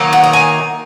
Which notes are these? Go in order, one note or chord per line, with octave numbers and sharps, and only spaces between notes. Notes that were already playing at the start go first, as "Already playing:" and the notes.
Already playing: D#3 F#3 A#3 D#4
F#5
A#5
G#5